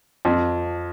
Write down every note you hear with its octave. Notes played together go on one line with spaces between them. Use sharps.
F2